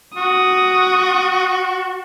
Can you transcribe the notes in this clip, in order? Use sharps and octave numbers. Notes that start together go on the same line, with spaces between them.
F#4 D#6